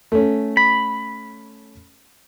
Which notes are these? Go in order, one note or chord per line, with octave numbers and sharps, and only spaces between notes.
A3 C#4
B5